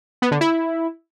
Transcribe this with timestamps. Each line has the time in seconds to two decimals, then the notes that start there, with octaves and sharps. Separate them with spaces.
0.22 B3
0.31 D3
0.41 E4